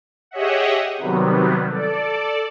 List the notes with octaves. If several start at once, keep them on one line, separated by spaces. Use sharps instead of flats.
G4 G#4 C#5 D#5 E5 F#5
C3 D#3 F#3 G3 B3
A4 D5